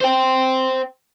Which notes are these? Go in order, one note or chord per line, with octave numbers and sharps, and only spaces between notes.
C5 G5